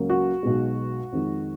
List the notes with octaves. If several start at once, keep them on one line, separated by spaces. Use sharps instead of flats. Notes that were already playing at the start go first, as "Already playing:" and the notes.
Already playing: C#2 C#3 F#3 A#3
F#4
B1 B2 G#3
F2 D#3 G#3